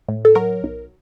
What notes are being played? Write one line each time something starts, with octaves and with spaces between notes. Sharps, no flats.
A2
A4
F#3 A#4
B1